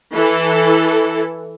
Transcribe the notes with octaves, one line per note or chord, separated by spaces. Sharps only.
E3 A4